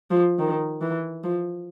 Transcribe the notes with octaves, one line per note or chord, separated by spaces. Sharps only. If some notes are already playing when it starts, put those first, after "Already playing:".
F3
D#3
E3
F3